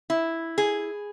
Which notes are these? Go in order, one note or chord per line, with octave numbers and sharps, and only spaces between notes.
E4
G#4